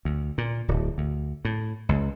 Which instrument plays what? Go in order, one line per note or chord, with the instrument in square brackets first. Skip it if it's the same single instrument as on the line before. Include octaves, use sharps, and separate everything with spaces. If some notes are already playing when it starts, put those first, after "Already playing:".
[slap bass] D2
A#2
D1
D2
A2
C#2